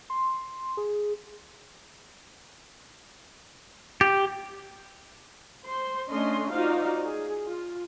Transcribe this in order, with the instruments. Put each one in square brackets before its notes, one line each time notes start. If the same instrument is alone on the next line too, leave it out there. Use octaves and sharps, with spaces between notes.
[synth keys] C6
G#4
[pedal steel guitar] G4
[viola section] C5 C6
A3 C#4 D4 D#5 C6
D#4 F4 F#4 C5 D5 F5
G#4
F4